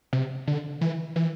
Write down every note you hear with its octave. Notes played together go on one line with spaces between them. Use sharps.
C3
D3
E3
E3